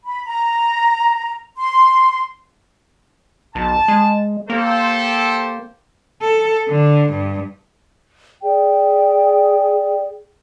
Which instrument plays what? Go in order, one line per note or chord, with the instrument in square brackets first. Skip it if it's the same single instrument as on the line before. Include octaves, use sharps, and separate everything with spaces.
[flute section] B5
A#5
C6
[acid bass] B1 [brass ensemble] A5
[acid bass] G#3
[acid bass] A#3 [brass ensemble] G4 A4 C5
[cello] A4
D3
G2
[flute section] G#4 D5 G5